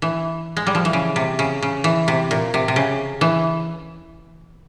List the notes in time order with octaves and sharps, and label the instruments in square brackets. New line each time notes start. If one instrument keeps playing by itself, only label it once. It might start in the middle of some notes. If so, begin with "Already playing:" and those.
[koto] E3
G#3
G3
F3
E3
C#3
C3
C#3
C#3
E3
C3
A#2
C3
C3
C#3
E3